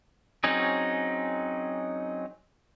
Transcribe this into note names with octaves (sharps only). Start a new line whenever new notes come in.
F#3 C4 C#4 D#4 G#4